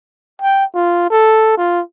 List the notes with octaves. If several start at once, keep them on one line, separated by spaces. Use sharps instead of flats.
G5
F4
A4
F4